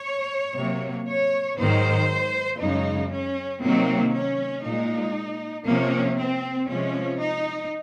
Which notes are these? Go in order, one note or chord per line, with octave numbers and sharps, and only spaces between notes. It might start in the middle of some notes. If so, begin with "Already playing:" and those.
Already playing: C#5
C3 F#3 A#3
C#5
G#2 D#3 F#3 C5
F#2 C#3 G#3 D#4
C#4
C3 D#3 F#3 A#3 C4
C#4
A#2 G#3 D#4
C3 F3 A#3 C#4
C4
C3 F3 G#3 C#4
D#4